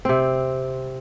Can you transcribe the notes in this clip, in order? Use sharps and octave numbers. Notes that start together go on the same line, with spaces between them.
C3 C4